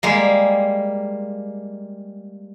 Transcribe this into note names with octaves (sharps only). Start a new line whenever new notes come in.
G3 G#3 A#3